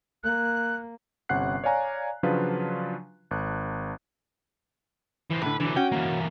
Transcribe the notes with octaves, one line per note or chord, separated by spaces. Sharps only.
A#3 F#6
G1 C3 C#4 F#5 F#6 C7
C#5 D5 F5 G#5 A#5
C#3 F3 F#3 D4 F4 B4
G#1 F#6
E3 C4
A2 D3 B4
D3 E3 F#3
C#4 F#4 G5
E3 A#3